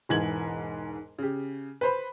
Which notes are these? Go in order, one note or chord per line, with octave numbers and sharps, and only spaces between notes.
E1 G#2 E3 G#6 F#7
C#3 G4
B4 C5 B5